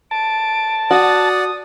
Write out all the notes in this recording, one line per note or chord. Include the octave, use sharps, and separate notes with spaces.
A5 D7
F#4 D5 F#5 D#6